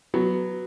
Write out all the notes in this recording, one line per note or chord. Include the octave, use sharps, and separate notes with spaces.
F#3 B3